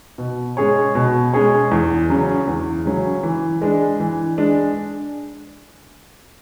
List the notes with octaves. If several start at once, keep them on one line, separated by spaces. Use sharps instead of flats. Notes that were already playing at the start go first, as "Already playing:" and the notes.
B2
G#3 C#4 G#4 C#5
B2
G#3 C#4 G#4 C#5
E2
C#3 F#3 C#4
E2
C#3 F#3 C#4
E3
G#3 D4
E3
G#3 D4